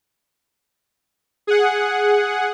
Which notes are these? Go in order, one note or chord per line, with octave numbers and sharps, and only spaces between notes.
G#4 F#5